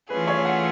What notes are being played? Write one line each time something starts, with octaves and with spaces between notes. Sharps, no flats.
E3 A3 C#4 F4 G#4 B4
C#5
F#5